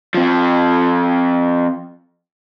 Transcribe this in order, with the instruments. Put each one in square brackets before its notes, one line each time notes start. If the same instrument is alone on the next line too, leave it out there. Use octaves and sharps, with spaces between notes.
[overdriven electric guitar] F3 C4